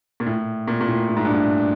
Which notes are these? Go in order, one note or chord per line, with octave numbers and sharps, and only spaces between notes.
A#2
A2
A#2
A#2
A2
A2
G#2
G2
G#2